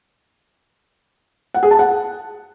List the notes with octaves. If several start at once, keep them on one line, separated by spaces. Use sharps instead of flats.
F#5
G#4
A5
F#5